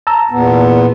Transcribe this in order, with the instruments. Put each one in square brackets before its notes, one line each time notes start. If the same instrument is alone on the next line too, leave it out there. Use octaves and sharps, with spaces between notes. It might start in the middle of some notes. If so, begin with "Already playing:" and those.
[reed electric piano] A5 A#5 E6
[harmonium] E2 A#2 B3